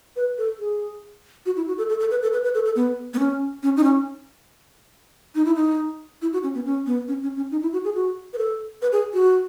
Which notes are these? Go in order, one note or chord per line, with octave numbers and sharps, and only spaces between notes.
B4
A4
G#4
F#4
E4
F#4
A4
A4
A4
B4
A4
B4
B4
A4
A4
B3
B3
C#4
C#4
D#4
C#4
D#4
E4
D#4
E4
F#4
C#4
B3
C#4
B3
C#4
C#4
C#4
D#4
E4
F#4
G#4
F#4
B4
A4
B4
G#4
F#4